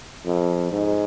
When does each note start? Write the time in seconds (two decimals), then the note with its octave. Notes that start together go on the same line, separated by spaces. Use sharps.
0.25 F2
0.72 G#2